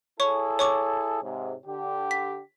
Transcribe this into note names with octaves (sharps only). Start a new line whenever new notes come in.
E4 G#4 A4 C#5 C#6
C#5 C#6 D6
G#2 C3
D3 G4
B6